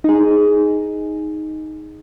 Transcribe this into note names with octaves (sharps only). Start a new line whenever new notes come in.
D#4 G#4